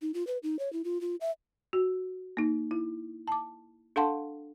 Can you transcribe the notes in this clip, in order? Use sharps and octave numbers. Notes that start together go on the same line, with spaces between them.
D#4
F4
B4
D#4
C#5
E4
F4
F4
E5
F#4
A#3 D#4
E4
A5 D6
D4 A4 F5 F#5 A5 C6